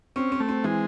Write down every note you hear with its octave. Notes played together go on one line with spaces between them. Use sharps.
C4 C#4
C4
A3
C4
E3 G#3